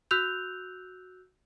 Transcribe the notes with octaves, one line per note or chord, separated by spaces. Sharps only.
F#4 E6 F#6 G6 F7